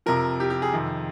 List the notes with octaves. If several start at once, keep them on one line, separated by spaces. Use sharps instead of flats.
F2 C3 F3 A#4
G4
G4
G#4
F2 C3 D#3